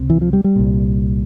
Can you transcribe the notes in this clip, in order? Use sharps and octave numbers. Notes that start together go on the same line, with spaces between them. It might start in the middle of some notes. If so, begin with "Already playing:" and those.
Already playing: C#2 C3
E3
F3
G3
G3
C2 A#2